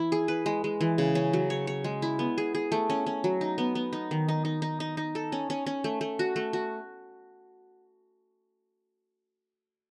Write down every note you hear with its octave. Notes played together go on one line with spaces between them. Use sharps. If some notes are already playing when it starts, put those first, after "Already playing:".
Already playing: E3 E4
G#4
B4
G#3
G#3
E3
C#3
C#4
F#3
C#5
C#5
G#3
E4
B3
G#4
G#4
A3
C#4
C#4
F#3
D#4
B3
B3
D#4
D#3
D#4
D#4
D#4
D#4
D#4
A4
C#4
C#4
C#4
A3
A3
F#4
A3
F#4